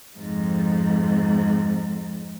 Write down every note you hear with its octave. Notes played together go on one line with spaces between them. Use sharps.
F2 G#2